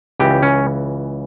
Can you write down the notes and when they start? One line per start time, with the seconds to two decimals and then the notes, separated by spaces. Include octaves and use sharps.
0.20 C#2 C#3 E3 G4
0.43 C#4